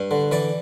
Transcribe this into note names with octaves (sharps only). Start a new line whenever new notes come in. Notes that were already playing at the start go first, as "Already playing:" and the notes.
Already playing: G2
D3
E3 D5